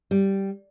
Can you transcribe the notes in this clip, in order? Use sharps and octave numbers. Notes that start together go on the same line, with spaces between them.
G3